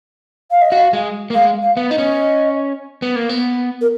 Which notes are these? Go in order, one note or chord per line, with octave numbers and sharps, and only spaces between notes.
F5
D#5
F#4 F5
G#3
A#3
G#3 F5
F5
B3
D#4 D#5
C#4
B3
A#3
B3
A#4